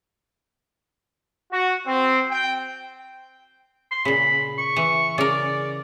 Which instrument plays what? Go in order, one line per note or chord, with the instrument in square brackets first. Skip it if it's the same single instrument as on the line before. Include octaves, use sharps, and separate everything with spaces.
[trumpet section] F#4
C4
G5
[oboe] C6
[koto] A#2 C#3 [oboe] B5
[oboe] C#6
[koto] E3
[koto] C#3 A#4 [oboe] D5